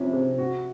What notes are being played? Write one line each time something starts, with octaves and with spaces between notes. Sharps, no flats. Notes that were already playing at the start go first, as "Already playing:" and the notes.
Already playing: C3 F3 C#4
C3
F#4